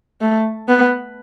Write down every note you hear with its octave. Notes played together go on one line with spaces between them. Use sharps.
A3
B3